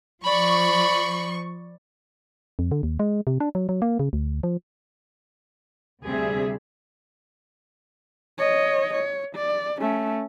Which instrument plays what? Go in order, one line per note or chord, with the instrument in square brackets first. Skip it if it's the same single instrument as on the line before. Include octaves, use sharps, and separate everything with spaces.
[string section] F3 C#6 [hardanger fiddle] D5 B5
[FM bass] F2
D3
D#2
G#3
C3
D4
F#3
F#3
A#3
C#3
D2
F3
[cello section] D2 C3 G3 C4 G#4 E5
[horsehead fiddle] C#5 D#5
C#5
D5
A3 C#4